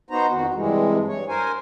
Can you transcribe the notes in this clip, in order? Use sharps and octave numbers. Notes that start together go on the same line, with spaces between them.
B3 D#4 F#4 C5 A#5
F2 D#3 F#4
G2 C3 E3 G#3
G2 C#5
A#4 C5 G#5